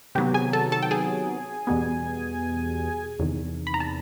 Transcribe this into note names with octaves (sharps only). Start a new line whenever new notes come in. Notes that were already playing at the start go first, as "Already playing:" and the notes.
C3 D#3 F#3 B3 G4 G5
G#4 G#5
A4 A5
A4 A5
G5
G#4 G#5
E2 B2 G3 B3
E2 C3 D#3
B5
A#5
A5